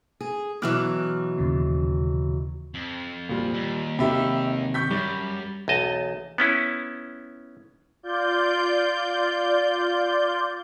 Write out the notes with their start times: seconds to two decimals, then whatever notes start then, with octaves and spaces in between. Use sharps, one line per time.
0.21 G#4
0.62 B2 E3 F#3 D6 F6 F#6
1.38 D#2 A#2 C#3
2.74 F2
3.29 A#2 G3
3.54 D#2
3.99 C3 D#3 G4 E5 B5
4.74 C#6 G6 B6
4.91 F#2 G3
5.68 B1 E2 D#5 A5
6.38 B3 C#4 E4
8.03 F4 D5 G6